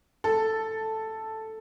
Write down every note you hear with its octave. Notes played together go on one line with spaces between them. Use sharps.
A4